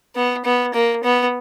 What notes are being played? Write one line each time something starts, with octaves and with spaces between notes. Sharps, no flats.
B3
B3
A#3
B3